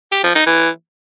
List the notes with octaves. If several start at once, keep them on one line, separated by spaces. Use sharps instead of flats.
G4
F3
D#4
E3